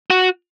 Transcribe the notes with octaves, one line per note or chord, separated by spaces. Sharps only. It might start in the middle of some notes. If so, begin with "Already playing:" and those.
F#4